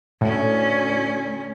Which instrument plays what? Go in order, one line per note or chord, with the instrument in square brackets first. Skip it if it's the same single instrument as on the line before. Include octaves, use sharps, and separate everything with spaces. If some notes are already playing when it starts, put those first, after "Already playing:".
[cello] D2 C#4 [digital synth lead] A2